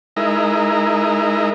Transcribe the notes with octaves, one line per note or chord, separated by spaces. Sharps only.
G#3 D#4 E4 A#4